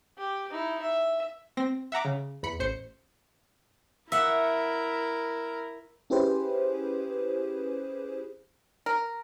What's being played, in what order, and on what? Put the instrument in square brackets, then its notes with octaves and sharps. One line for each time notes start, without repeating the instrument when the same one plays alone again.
[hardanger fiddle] G4
D#4 E4
E5
[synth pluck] C4 A#6
E5 F#5 A#5 D6
C#3
E2 B5 C#7
A1 C5 C#7
[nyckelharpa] E4 A#4 [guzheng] E5 F#5
[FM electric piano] C#4 E4 G4 G#4 B4 C5
[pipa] A#4